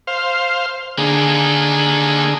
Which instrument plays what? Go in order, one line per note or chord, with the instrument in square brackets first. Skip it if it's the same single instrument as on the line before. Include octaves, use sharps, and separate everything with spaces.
[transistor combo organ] C5 F5
[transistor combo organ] D3 G#4 [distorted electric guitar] A#3 D#4